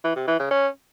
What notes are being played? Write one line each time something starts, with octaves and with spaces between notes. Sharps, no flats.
E3
C3
E3
C#3
C#4